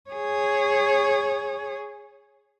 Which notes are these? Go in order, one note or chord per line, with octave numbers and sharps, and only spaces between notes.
G#4 C#5